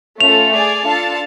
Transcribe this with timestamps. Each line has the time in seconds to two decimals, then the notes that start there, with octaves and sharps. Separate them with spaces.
0.20 A3 C#4 F4 A4 F7
0.53 G#4 D5 G#5
0.85 D4 F4 A4 F5 A5